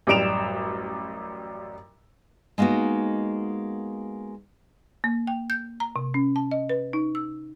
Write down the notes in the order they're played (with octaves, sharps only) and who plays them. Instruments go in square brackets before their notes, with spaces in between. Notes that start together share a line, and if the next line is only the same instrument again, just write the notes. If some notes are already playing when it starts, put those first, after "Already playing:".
[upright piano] A1 F#2 G3 D7 E7 F7
[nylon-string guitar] G#3 A#3 B3 D#4 F#4
[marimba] A#3
G5
G6
A#5
C3
C#4
A5
D#5
B4
D#4
E6